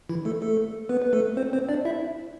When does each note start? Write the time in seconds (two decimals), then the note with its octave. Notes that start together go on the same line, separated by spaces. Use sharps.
0.09 E3 E4
0.25 A3 A4
0.42 A3 A4
0.89 B3 B4
1.02 B4
1.13 A3 A4
1.37 C4 C5
1.53 C4 C5
1.69 D4 D5
1.85 E4 E5